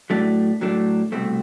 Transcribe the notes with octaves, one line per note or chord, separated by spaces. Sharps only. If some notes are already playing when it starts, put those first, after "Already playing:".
A2 F#3 A3 D4
A2 F#3 A3 D4
C2 B2 A3 C4